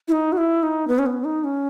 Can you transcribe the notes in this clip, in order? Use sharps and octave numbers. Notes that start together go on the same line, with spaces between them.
E4
D#4
F#4
E4
D#4
B3
C#4
B3
D#4
C#4